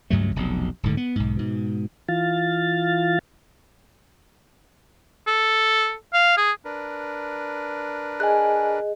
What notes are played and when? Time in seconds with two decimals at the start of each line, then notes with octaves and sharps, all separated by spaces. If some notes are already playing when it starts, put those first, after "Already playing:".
0.10 C#2 G2 F#3 A3
0.36 F1 B1
0.83 D1 G#2 D3
0.97 B3
1.16 B1 G#2
1.36 G#2 B2
2.09 E3 F4 F5 A6
5.27 A4
6.13 F5
6.37 G#4
6.65 D4 A#4 B4
8.20 G#4 D#5 G#5 F#6